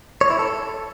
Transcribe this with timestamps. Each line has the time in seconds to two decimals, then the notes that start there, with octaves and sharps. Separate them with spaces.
0.21 C#5
0.30 E4
0.39 A4